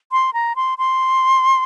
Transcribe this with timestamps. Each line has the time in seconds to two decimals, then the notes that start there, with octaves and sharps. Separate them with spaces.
0.12 C6
0.33 A#5
0.56 C6
0.78 C6